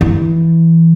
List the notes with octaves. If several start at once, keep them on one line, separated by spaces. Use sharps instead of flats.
E3